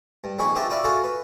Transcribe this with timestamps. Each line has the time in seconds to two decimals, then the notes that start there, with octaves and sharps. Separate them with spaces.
0.24 G2
0.39 A#1 F2 D#4 G#4 B5 C#6
0.55 D4 F4 G4 B4 D#5 E5
0.70 F#4 B4 D5 E5 F5
0.84 F4 F#4 G#4 A4 F5 F#5
1.04 B4